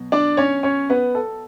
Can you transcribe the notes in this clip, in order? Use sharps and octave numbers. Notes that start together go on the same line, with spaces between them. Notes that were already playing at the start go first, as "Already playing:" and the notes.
Already playing: B2 F#3
D4 D5
C#4 C#5
C#4 C#5
B3 B4
A4